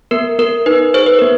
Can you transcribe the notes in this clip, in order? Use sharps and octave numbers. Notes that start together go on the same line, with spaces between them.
B3 A#4
B3 A#4
D#4 B4
G#4 C5
B4
B3 A#4